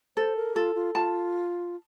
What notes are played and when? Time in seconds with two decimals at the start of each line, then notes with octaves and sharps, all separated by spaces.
0.16 A4 C5
0.36 A#4
0.55 F4 A4
0.75 F4
0.94 F4 A5